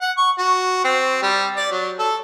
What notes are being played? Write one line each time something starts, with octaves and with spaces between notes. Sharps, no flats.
F#5
C#6
F#4
C4
G3
D5
F#3
A4